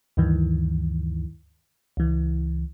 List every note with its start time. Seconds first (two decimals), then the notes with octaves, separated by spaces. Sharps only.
0.17 D2 G2 D#3 E3
1.97 C#2 E3